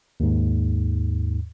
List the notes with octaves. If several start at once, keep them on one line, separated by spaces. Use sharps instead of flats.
D#2 G#2